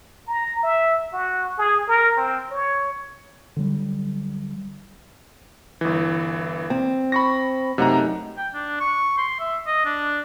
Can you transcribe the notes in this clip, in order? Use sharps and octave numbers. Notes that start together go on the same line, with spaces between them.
A#5
E5
F#4
G#4
A#4
C4
C#5
D3 F#3 G3
G1 E3
C4
B5 C#6 A#6
F#2 C3 A3 D#4 F#5 A#5
G5
D4
C#6
C6
E5
D#5
D4